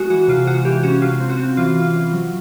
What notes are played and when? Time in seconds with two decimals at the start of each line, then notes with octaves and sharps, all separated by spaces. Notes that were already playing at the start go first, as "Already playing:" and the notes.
Already playing: G#3 F#4
0.10 E3 F#4
0.28 C3 F4
0.47 G#3 F#4
0.65 E3 G4
0.83 C#4 F#4
1.02 C3 F4
1.20 C4
1.30 F#4
1.40 C4
1.57 E3 F4
1.76 E3 F4
1.94 E3
2.13 F#3